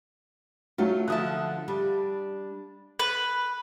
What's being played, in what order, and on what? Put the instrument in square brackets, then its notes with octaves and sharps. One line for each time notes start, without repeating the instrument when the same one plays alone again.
[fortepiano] F#3 F4 [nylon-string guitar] A3
[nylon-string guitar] D3 F3 A5 [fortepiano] E5 D#6 F#6
[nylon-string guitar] G3 D4
[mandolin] B4